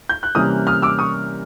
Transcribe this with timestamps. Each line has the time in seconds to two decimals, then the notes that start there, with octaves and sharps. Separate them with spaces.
0.09 G6
0.23 F#6
0.35 C3 E3 G3 A#3 C#4 D#6 F6
0.67 D#6 F6
0.82 D6 E6
0.99 C#6 D#6